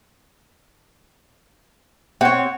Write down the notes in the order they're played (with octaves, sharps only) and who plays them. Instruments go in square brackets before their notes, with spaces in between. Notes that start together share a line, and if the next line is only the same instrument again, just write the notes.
[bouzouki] C4 C#5 [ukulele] F#5